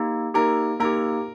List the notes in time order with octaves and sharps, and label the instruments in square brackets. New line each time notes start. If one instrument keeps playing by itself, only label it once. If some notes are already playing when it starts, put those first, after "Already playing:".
Already playing: [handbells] A#3 D#4 G4
[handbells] A#3 D#4 G4 [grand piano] A#4
[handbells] A#3 D#4 G4 [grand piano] A#4